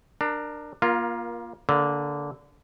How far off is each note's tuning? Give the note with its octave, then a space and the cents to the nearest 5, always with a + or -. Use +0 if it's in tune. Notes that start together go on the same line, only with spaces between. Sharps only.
D4 +20 A#4 +0
A#3 +30 F4 +0 A#4 +15
D3 -20 A#3 +0